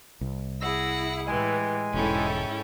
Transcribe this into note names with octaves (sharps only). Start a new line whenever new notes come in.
C2
E4 G#4 F#5 E6 A#6
A2 E3 G#3 G4 G#5
E1 G#2 C#4 E4 A4 G5